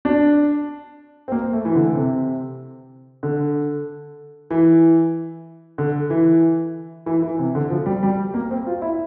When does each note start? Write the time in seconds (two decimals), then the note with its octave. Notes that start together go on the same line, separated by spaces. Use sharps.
0.05 D4
1.28 C4
1.32 A#3
1.53 A3
1.65 E3
1.75 D3
1.95 C3
3.23 D3
4.51 E3
5.78 D3
6.10 E3
7.06 E3
7.22 E3
7.39 C3
7.55 D3
7.70 F3
7.86 G3
8.03 G3
8.34 A#3
8.51 C4
8.66 F4
8.82 E4